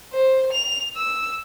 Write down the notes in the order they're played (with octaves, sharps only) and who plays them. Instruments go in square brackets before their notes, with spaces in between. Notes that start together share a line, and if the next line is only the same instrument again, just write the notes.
[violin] C5
F7
E6